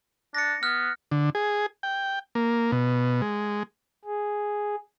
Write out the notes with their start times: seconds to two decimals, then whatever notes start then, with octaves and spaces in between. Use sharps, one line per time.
0.35 D4 A#6 C#7
0.63 B3 F6 F#6
1.11 D3
1.35 G#4
1.83 G5
2.35 A#3
2.72 B2
3.22 G#3
4.05 G#4